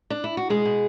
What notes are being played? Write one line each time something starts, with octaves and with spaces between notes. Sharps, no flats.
D4
E4
F#4
B2 G#3 G#4
B2